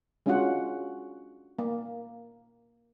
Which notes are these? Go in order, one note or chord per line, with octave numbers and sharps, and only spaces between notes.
G#3 C#4 D4 F4 F#4 F#5
A#3